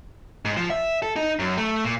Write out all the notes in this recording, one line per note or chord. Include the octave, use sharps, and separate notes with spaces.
G#2
F3
E5
A4
D#4
F#2
A3
A#2